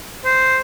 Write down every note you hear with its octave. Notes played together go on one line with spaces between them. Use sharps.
C5